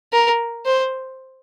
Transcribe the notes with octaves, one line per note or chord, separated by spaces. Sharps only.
A#4
C5